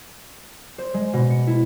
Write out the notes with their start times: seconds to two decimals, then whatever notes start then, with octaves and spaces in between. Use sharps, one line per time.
0.78 C5
0.94 G#3
1.13 B2
1.30 C#7
1.47 E4